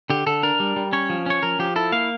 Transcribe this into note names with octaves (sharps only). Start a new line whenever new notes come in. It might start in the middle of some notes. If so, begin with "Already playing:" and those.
D3 G4
D3 A4
D4 A#4
G3
G3
C#4 C#5
F3
C#4 C#5
F3 A#4
F3 G4
E4 A4
A#3 F5